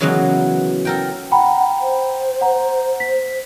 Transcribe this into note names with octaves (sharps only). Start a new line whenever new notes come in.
C#3 E3 F#3 G#3 A#3 B3
A4 A#4 G5
F#5 G5 A#5 B5
C5
F#5 A#5
B6